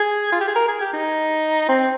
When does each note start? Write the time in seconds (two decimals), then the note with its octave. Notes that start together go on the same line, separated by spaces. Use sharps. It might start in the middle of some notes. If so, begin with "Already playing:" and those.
Already playing: G#4
0.32 F4
0.41 G4
0.48 G#4
0.56 A#4
0.68 G#4
0.80 G4
0.93 D#4
1.68 C4